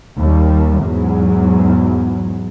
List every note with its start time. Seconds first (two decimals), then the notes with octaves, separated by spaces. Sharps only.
0.18 D#2 G3
0.83 E2 G#2 F#3